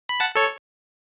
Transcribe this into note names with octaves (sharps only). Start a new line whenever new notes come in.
B5
F#5 A5
A4 C#5